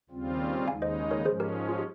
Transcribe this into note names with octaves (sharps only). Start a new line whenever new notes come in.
D#2 C#3 G3 C4 F4
D#2 C#3 G#3 D#4 F5 G#5
C5 D#5
A#4 C#5
G#2 F3 G#3 C#4 G#4 C5
G4 A#4
F4
G4